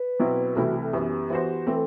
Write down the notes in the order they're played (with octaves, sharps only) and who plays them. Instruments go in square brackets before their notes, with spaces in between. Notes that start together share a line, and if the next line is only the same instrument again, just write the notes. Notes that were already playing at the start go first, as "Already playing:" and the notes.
Already playing: [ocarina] B4
[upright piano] B2 F#3 C4 E4
[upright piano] C2 C3 E3 A3 E4 [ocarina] F#4
[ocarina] A4
[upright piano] F#2 E3 B3 [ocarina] G4
[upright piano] E3 B3 F#4 C5
[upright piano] E3 A3 C4 [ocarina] A4